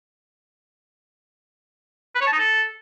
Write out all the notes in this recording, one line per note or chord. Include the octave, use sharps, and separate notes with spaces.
B4
C#5
A5
D#4
A4